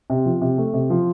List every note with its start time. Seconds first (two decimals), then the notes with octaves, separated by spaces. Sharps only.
0.10 C3
0.26 F3
0.42 C3
0.58 A3
0.73 C3
0.90 F3